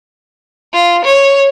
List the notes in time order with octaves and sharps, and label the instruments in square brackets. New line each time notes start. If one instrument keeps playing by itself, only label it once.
[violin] F4
C#5